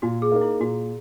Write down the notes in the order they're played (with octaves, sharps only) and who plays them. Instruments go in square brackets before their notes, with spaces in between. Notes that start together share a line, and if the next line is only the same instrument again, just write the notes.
[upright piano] A#2 [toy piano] F#4
[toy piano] G#4
[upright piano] A#3 D#4 A#4
[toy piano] E4
[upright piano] A#2 [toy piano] F#4